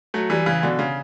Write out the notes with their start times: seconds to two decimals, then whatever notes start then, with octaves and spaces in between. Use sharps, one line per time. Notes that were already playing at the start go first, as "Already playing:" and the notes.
0.14 F#3 A3
0.30 E3 G3
0.46 C#3 E3
0.63 B2 D3
0.79 C#3